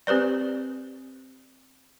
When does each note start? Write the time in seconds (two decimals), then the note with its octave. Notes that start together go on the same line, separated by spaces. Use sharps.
0.07 C4 G4 B4 C5 D5